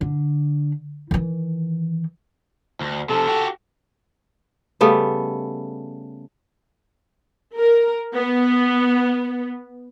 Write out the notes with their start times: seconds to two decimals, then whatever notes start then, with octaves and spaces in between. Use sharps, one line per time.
0.01 D3
1.11 D#3 E3
2.81 D2
3.09 C3 F3 A4
3.28 F#4 G4
4.81 C#3 G3 A3 B3
7.57 A#4
8.15 B3